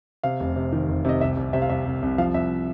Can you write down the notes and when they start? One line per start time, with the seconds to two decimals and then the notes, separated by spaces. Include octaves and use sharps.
0.23 C3 F5
0.40 F1
0.56 C3
0.72 D#3
0.89 F1
1.05 C3 D#5
1.21 C2 E5
1.37 C2
1.53 C3 E5
1.62 F5
1.69 C2 E5
1.86 C2
2.02 C2
2.18 F3 F5
2.34 C2 E5